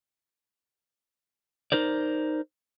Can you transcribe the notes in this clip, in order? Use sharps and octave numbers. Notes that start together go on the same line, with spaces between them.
D#4 A#4 C5 D5